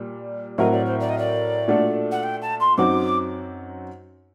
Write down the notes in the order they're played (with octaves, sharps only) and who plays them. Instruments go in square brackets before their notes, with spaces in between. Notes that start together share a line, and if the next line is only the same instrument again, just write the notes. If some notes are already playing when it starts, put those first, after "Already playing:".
Already playing: [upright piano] A#2 G3 A#3
[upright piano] A2 F#3 C4 F#4 A#4 [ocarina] D#5
[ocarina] D5
C5
D5
D#5
D5
[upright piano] A#2 A3 D4 F#4 A4
[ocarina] F#5
G5
A5
C6
[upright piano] F#2 F#3 C4 D#4 F#4 [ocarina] D6